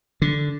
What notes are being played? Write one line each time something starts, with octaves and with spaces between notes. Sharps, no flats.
D3